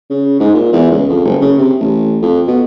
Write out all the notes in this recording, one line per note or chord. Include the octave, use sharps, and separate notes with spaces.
C#3
G#2
A#2
E2
C#2
F2
F#1
C#3
C3
A1
F2
B2